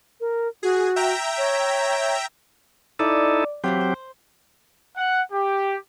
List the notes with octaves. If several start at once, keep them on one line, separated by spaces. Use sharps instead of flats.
A#4
F#4 G#4
E5 G5 A#5
C#5
D#4 E4 A4 D5
E3 F#3 B3 C4 F4 G4
C5
F#5
G4